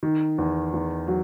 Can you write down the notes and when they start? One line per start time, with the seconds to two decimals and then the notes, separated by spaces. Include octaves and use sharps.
0.03 D#3
0.38 E2
0.73 E2
1.08 F#3